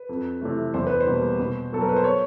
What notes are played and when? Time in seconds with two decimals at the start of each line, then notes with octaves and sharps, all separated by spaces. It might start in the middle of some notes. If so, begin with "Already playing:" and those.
Already playing: B4
0.09 F2
0.42 C3 E3 A3
0.74 E2 C5
0.87 B4
1.01 C5
1.07 B2 G3 A#3
1.39 B2
1.72 F#3 B3 A4
1.81 A#4
1.89 B4
1.96 C5
2.04 C#5